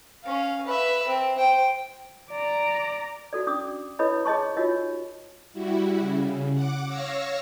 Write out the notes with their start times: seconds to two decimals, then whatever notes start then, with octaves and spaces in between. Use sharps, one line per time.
0.23 C#4 F5
0.66 B4 E5
1.08 C4
1.38 C5 G5
2.31 D5 A#5
3.33 F#4 A4 D5
3.47 C#4 D4 D6 D#6
3.99 E4 A4 B4 C#5 D#5 B5
4.25 G#4 C#5 D#5 A5 C6 C#6
4.57 D#4 F4 F#4 A#4 C#5 D#5
5.53 G3 E4 F#4
6.00 C#3
6.53 F#5 D6
6.87 C#5 F5 E6 A#6 C#7